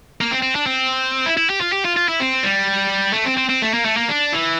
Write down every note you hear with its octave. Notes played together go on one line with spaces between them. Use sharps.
A#3
C4
C4
D4
C4
E4
E4
G4
F4
G4
F4
F4
E4
C4
G3
A3
C4
C4
C4
A3
A#3
A3
A#3
D4
E3